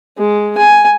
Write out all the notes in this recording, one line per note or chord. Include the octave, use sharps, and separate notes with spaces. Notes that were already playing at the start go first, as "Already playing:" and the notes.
G#3
G#5